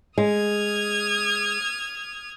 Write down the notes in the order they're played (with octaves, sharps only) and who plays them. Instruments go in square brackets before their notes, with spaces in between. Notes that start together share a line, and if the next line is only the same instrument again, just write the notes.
[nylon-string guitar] G#3 [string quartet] D#6 F6 G#6